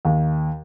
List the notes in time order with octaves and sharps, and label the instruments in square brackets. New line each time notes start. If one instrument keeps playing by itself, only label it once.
[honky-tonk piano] D#2